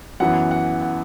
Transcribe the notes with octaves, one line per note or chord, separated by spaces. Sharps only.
F#2 E3 B3 F#5
F#5
F#5